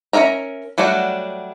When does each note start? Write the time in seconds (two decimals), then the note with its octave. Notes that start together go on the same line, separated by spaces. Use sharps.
0.13 C#4 D#4 A#4 E5 A#5
0.78 F#3 G3 A3 D4 F#4